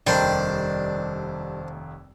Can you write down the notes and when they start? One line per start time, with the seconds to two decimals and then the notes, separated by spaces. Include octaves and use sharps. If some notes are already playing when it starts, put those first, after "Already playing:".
0.06 F1 D#2 D#3 G3 D4 C5 D5